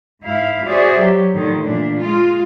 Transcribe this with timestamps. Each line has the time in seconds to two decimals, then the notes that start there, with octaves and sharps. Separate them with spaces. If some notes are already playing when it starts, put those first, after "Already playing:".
0.23 G#2 E4 F5
0.66 F#4 G#4 C5 D5 E5
0.98 F#3 G4
1.33 A2 D3 D#3 F3
1.63 A#2 E3 D4
1.97 G#3 F4